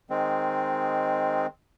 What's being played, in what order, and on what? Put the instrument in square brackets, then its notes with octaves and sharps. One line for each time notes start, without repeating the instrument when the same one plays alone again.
[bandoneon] D#3 G#3 C4